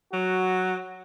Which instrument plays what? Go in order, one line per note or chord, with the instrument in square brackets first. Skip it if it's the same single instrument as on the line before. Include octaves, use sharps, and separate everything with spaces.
[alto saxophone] F#3 [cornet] F#4